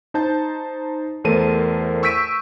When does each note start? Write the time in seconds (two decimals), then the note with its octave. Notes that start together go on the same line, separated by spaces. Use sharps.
0.14 D#4 C5 A5 G6
1.24 E2 A3 A#4 C5 A5 D#7
2.03 C#6 E6 G6 B6 D7 D#7